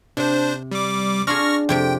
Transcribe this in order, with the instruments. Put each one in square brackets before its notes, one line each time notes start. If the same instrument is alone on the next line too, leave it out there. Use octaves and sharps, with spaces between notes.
[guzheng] C3 [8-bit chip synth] D4 C5
[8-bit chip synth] G3 D6
[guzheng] D4 F4 G#4 [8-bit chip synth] C#6 F6 A#6
[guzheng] F2 C3 G4 [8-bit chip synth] G5